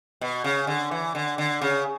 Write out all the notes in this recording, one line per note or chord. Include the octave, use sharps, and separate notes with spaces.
B2
C#3
D3
E3
D3
D3
C#3